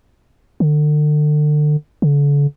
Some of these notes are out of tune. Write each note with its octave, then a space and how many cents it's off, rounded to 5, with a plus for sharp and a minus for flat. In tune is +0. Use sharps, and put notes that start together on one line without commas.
D3 +35
D3 -40